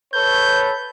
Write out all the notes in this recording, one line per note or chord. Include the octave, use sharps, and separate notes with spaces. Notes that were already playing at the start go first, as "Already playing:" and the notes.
A4 B4 C#5 G6